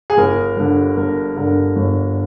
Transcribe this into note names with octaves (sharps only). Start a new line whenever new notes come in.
G#4
G1 A#4
G2 D3
G1 A#4
G2 D3 A#4
G1